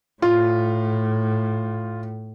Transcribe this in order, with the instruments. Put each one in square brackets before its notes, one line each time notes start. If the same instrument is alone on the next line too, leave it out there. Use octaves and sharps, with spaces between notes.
[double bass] A2 [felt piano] F4